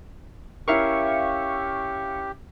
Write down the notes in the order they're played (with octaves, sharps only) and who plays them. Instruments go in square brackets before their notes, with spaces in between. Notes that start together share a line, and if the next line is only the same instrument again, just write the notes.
[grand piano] C#4 E4 A#4 [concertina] G4 [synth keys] E5 F5 C#6